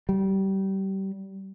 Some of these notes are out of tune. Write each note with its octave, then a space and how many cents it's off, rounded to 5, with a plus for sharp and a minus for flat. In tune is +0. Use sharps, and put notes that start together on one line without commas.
G3 -25